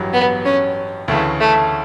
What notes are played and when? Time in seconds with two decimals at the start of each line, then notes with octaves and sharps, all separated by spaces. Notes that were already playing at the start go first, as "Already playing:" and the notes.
Already playing: A1 G2 F#3
0.13 B3
0.45 C#4
1.08 D2 C#3 E3 A3
1.40 A3